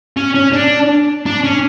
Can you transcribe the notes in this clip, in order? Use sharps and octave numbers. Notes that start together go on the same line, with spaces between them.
C#4
C#4
D4
D4
C#4